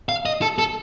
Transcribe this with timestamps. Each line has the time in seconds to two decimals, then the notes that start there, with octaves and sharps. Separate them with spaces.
0.09 F5
0.26 D#5
0.42 A4
0.58 A4